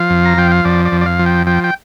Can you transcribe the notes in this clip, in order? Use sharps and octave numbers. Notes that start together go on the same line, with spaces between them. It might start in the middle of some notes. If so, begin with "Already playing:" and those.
Already playing: F3 F5
F2
A#5
F3 G5
F5
F2 D5
D5
F2
D5
F5
F3
G5
F3 G5
G5